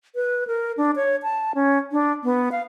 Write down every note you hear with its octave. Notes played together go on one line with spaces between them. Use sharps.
B4
A#4
D4
C#5
A5
C#4
D4
B3
F5